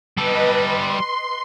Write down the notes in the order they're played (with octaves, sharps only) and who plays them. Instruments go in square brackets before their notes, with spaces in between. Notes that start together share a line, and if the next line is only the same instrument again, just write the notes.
[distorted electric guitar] G3 A4 [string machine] B4 D#5
[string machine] C6